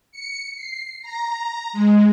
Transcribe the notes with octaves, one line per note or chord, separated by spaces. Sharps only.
C#7
C7
A#5
G#3